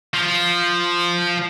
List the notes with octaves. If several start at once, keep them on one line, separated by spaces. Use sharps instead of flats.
F3